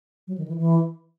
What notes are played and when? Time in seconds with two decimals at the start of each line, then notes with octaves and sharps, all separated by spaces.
0.27 F#3
0.38 D#3
0.48 E3
0.58 E3